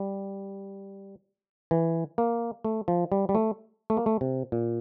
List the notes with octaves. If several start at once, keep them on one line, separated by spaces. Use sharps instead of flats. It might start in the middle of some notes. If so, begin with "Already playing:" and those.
Already playing: G3
E3
A#3
A3
F3
G3
G3
A3
A3
A#3
A3
C3
A#2